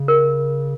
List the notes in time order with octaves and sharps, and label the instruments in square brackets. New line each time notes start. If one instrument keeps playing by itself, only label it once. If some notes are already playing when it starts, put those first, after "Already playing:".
Already playing: [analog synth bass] C#3
[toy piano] A#4